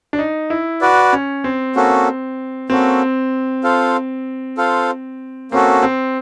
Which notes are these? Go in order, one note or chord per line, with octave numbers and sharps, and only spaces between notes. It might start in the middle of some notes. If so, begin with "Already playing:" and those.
D4
D#4
E4
F#4 B4 D5
C#4
C4
A#3 C#4 F#4 A4
A#3 C4 C#4 F#4 A4
F4 A4 C5 F5
F4 A4 C5 F5
A#3 C4 C#4 F#4 A4
C4